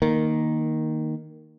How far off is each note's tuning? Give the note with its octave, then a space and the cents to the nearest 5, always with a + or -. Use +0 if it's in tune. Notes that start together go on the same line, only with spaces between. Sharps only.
D#3 +0 A#3 +0